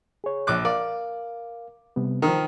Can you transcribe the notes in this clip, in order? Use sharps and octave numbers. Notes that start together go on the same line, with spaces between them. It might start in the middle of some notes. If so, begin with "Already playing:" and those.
G#4 C#5
A#1 D6 F#6
A#4 D5 F5
C3 G3 B3
D#3 F3 A#4